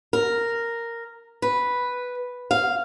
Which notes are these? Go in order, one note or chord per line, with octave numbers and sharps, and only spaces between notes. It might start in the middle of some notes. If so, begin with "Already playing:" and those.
A#4
B4
F5